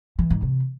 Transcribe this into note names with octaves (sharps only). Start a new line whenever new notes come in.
E3
G#2
C3